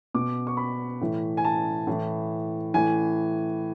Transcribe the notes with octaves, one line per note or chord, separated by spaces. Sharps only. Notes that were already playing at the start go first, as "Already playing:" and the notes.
B2 D6
C#6
B5
A2 E3
G#5
A5
A2 E3
A2 E3 G#5